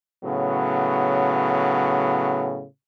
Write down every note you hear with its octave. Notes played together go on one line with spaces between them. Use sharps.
A2 C#3 F#3 B3